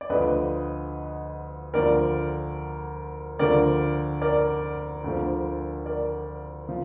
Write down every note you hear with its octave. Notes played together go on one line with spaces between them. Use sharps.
D5
D2 D3 F3 B4 D#5
D2 D3 F3 A#4 D5
D2 D3 F3 A#4 D5
A#4 D5
D2 D3 F3
A#4 D5
F3